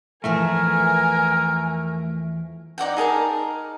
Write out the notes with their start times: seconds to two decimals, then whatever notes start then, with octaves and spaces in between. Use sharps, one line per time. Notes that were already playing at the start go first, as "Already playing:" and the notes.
0.24 E2 E3 F3 A3 A#4 G#5
2.78 D#4 D5 F#5 G5
2.97 D#4 G#4 A#4 A5